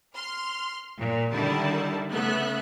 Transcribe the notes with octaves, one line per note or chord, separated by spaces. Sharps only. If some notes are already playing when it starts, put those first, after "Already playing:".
C6 F6
A#2
D3 D#3 G3 E4 A5
C#3 A3 B3 E5 F#6